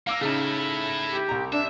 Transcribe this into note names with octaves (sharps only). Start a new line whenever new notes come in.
A#3 F5 D6 E6
C#3 A3 D#4 E4
G4
C2 A#5
D4 E5